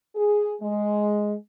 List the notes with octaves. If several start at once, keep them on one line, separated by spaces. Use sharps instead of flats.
G#4
G#3